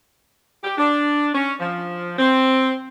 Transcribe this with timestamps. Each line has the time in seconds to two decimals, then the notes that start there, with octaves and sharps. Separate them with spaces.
0.63 G4
0.78 D4
1.34 C#4
1.60 F3
2.19 C4